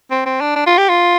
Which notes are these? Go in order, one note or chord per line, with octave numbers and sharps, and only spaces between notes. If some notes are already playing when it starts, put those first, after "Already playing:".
C4
C4
D4
D4
F4
G4
F4